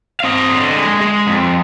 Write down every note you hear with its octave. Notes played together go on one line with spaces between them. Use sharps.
F5
C4 D#5
D3
G#3
G#3
F2